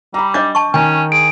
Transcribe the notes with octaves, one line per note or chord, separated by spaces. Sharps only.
G3 A#5 B5
D4 D#5 D6 G6 A6
A5 C#6
D#3 C#4 G#5
G#4 D7